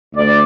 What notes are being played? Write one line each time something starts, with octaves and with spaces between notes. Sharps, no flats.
D2 D5